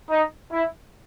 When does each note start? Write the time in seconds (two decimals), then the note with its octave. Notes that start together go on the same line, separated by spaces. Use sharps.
0.09 D#4
0.51 E4